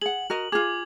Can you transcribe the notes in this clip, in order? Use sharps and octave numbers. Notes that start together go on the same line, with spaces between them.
G#4 F#5 F#7
F#4 A#4 D#5
F4 G#4 D6 G#6